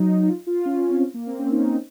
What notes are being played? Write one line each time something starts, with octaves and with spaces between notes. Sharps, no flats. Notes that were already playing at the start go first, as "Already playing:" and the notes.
Already playing: F#3 D#4
D#4
F4
F4
C#4
C#4
C4
A#3
C4
C#4
D#4
D#4